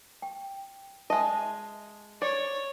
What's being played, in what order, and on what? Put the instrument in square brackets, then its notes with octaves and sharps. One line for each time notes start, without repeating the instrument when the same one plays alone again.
[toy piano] G5
[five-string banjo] G#3 D#5 [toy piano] E5 A5
[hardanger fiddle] C#5 [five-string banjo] D5